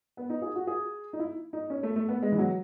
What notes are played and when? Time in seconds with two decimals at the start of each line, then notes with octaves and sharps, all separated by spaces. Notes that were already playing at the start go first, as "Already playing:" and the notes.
0.17 B3
0.30 D#4
0.42 G#4
0.56 F#4
0.67 G#4
1.13 D#4
1.19 E4
1.53 D#4
1.70 C#4
1.83 A3
1.96 A3
2.09 B3
2.22 G#3
2.32 E3
2.38 F#3